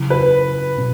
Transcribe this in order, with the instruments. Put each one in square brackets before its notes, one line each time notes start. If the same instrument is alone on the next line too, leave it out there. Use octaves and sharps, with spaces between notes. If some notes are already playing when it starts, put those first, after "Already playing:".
Already playing: [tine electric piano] C#3 F#3 C#4 E4
[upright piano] B4
[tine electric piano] B2 F#3 C#4